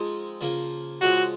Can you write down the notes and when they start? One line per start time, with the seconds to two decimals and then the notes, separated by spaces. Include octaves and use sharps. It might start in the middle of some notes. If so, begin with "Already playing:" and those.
Already playing: F3 G#3 C4 D#4
0.41 C#3 F3 A#3
1.01 C#3 F3 G#3 F#4